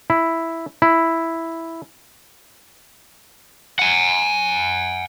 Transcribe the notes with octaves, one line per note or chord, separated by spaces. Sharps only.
E4
E4
F#5 G#5